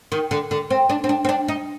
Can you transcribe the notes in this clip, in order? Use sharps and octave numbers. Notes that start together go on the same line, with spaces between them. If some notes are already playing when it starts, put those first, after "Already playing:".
D#3
D3
D3
C4
D4
C4
D4
C4
D4
D#4